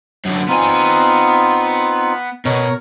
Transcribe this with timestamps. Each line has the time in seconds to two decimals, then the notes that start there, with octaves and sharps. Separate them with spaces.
0.25 F#2 D3
0.48 B3 C4 D#4 F4 G#5
2.45 B2 A#4 C#5 A#5